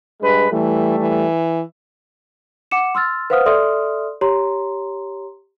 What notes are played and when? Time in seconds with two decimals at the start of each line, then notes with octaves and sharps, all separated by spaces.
0.22 G2 G#3 B4
0.52 E3 G3 A3
1.00 E3
2.71 F#5 D6 C#7 E7
2.95 C6 E6 F6 A6
3.30 B4 C5 F5 F#5 D#6 F6
3.46 A4 D5 E5 C6 D#6 F6
4.21 G4 C#5 A#5 C6